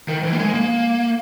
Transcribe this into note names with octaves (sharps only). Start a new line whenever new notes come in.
D#3
E3
A#3
G#3
A#3